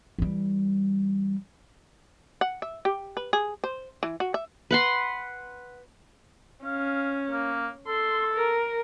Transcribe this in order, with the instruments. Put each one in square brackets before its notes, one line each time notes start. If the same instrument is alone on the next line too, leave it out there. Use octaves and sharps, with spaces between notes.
[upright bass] E3 G3
[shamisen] F#5
E5
G4
B4
G#4
C5
E3
F#4
E5
[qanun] B4 F#5 C6
[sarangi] C#4 [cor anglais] F5
[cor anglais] A#3
[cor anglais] A4 [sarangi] C6
[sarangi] A#4